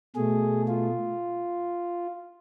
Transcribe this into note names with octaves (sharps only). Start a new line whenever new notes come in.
B2 A3 G#4
F4